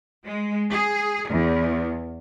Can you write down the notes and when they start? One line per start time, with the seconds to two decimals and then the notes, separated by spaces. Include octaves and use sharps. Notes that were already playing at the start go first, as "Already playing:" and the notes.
0.24 G#3
0.71 G#4
1.30 E2